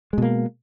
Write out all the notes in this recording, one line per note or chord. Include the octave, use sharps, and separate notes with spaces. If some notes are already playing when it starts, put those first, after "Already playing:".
B2 G#3 A#3